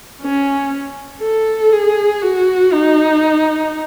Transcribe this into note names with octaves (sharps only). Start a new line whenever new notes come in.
C#4
A4
G#4
F#4
D#4